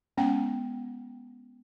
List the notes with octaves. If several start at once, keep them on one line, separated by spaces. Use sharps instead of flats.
G#3 B3 C#4 F#5 G5